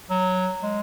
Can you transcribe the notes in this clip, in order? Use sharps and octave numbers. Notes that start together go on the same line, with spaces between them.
F#3
G#3